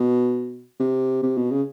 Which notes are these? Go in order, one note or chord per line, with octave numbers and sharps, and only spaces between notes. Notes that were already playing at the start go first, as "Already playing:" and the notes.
Already playing: B2
C3
C3
B2
C#3